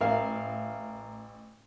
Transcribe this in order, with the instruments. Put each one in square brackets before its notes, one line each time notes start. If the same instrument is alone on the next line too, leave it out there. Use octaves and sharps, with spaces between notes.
[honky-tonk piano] A1 [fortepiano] A#4 E5 F5